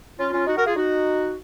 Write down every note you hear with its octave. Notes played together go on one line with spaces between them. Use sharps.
C#4 F4
C#4 F4
D#4 F#4
F#4 A#4
F4 G#4
D#4 F#4